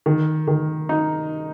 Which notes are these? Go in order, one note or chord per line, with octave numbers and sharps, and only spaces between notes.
D#3
D#3
D#4